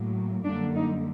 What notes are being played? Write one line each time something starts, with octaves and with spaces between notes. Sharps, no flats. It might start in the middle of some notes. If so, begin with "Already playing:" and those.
Already playing: A2 F#3 A#3
F#2 D3 G3 A#3 D4
D#4